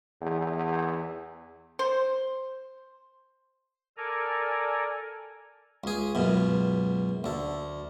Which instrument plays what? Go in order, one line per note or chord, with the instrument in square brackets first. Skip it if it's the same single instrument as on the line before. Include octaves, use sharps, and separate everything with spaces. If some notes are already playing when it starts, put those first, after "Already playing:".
[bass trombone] E2
[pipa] C5
[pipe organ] A4 A#4 D5 G#5 A#5
[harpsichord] C#2 G#4
C#2 F#2 B2
D2 A4